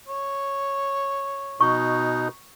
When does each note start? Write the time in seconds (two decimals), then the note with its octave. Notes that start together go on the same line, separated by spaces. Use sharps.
0.08 C#5
1.60 B2 D#4 C#6